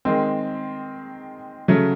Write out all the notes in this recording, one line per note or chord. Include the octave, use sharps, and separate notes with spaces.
D#3 G#3 C4
C#3 F#3 A3